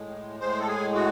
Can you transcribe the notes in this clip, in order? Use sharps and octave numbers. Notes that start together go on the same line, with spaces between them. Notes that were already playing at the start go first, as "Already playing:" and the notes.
Already playing: A2 G#3
A2 G#3 C5
A4
G#4
F#4